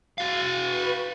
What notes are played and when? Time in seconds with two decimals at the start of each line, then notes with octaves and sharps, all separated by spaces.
0.18 F#4 F5
0.58 B4